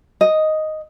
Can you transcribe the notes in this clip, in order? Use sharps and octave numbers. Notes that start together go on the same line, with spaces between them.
D#5